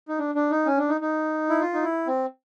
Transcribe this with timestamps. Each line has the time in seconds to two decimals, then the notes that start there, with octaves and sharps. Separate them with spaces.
0.09 D#4
0.19 D4
0.35 D4
0.51 D#4
0.66 C#4
0.78 D4
0.89 D#4
1.01 D#4
1.49 E4
1.61 F4
1.74 D#4
1.83 E4
2.07 C4